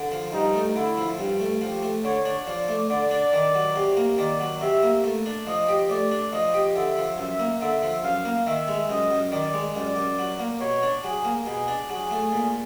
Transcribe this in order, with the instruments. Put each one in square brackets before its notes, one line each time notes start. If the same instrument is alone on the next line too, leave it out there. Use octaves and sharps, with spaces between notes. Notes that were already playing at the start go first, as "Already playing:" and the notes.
Already playing: [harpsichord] D3
F3
[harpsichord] G2 [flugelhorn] D#4
[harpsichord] A3
[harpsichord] D3 [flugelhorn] E4
[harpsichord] F3
G2
A3
[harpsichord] F3 [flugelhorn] G4
[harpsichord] A3
[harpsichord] D3 [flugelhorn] C#5
[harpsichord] D4
[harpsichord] F3 [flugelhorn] D5
[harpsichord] A3
[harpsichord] D3 [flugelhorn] D5
[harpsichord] D4
D#3
F#3
C3
A#3
[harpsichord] D#3 [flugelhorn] D5
[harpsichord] F#3
[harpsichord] C3 [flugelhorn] E5
[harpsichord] A#3
A3
D4
[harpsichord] F3 [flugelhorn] D#5
[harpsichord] G4
[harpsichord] A3 [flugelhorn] D5
[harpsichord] D4
[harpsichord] F3 [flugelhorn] D#5
[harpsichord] G4
[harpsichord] D3 [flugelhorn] E5
[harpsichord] F3
[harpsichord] F#2 [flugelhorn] E5
[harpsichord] A#3
[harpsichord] D3 [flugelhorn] E5
[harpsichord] F3
[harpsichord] F#2 [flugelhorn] F5
[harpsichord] A#3
[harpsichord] D#3 [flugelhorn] E5
[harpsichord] G#3
[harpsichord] F#2 [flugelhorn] D#5
[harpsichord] F#2
[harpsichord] D#3 [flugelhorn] D5
[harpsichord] G#3
[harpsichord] F#2 [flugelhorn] D5
[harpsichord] F#2
F#3
A#3
[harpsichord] B2 [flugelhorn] C#5
[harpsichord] D4
[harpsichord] F#3 [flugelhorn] G#4
[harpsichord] A#3
[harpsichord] B2 [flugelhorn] G#4
[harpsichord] D4
[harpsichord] F#3 [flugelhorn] G#4
[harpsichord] A3
A#2